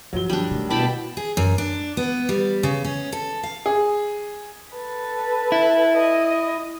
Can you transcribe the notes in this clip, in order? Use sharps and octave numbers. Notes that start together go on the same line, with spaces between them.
G2 F3 F#3 G7
G3 D4
D#3 A3
B2 E4 D5 G5 A5 B5
G#4
F#2
D4
B3
G3
C#3
C#4
A4
F5
G#4
A4 B4
E4
D#5